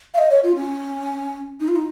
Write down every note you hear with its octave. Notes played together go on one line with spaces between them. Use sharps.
F5
D#5
C#5
F4
C#4
D#4
F4
D#4